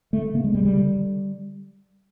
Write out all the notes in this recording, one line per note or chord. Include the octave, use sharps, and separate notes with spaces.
D3 A3
C#3 A#3
G#3
C#3 G3
G3
D3
D3